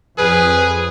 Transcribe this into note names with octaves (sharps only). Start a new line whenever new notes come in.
F2 G#4 B4